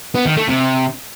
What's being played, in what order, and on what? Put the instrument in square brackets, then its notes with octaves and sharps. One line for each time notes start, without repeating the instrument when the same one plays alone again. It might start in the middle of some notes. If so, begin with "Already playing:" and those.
[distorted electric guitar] B3
D#3
A3
C3